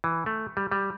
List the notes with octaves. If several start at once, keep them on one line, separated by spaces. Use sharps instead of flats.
E3
A3
G3
G3